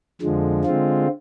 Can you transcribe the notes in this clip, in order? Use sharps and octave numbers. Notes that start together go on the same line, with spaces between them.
F2 D3 F3 G#3
D3 G#3 C4 F4